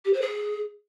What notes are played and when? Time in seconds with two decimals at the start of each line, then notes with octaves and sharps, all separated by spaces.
0.05 G4
0.13 C5
0.22 G#4